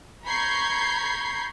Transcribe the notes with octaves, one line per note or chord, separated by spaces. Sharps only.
A#5 B5 C#6 G6 G#6 C7